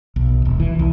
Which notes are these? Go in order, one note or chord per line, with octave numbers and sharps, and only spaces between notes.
B1
D#1
E3
C2